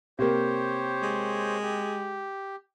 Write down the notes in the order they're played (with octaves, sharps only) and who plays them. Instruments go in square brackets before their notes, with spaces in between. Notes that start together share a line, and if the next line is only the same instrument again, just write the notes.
[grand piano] C3 A#3 [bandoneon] G4 C5 C#5
[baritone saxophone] G#3
[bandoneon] G4